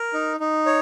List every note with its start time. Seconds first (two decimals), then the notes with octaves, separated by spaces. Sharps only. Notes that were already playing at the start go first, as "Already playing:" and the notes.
Already playing: A#4
0.14 D#4
0.40 D#4
0.66 C#5